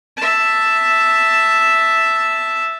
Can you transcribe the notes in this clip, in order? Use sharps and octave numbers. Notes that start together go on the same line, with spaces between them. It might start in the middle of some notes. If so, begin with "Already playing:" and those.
E5 A5